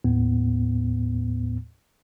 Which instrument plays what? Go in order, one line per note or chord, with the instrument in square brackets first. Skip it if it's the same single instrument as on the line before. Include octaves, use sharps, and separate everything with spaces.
[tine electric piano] D#2 A2 B3